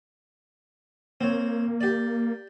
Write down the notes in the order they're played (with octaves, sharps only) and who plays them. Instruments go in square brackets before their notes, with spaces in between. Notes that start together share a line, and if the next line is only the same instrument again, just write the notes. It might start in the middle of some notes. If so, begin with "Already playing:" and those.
[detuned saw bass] A#3 [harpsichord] C4 C#5
[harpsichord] G4 D5